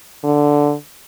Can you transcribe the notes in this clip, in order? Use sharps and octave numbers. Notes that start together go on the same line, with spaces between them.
D3